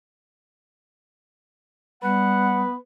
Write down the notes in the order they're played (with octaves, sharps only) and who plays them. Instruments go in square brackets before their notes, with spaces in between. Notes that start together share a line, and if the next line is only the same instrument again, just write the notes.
[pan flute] G3 [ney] B3 [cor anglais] B4 [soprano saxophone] F#5